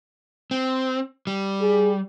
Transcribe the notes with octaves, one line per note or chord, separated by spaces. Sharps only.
C4
G3
G#4